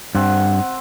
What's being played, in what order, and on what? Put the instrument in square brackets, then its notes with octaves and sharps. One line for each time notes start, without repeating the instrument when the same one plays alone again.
[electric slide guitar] G2 [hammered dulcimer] C4 F#5